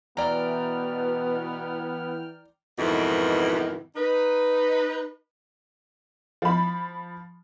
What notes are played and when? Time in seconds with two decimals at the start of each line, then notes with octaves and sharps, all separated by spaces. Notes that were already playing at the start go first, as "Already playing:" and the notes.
0.17 B2 E3 B3 D5 G5 A#5 F6
2.78 F2 G#2 B2 D#3 E3
3.95 D#4 B4
6.42 F3 B5